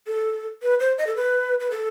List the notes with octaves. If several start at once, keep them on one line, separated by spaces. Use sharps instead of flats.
A4
B4
C5
D#5
A4
B4
B4
A4